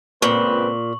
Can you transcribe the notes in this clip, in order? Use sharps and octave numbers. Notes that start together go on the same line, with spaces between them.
C#2 A#2 C4 B4 C#6 F#7